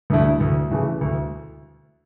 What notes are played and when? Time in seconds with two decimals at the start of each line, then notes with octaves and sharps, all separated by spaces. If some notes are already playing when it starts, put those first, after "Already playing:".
0.10 D2 D3 A3 E4
0.40 D2
0.71 C#3 E3 A3
1.01 D2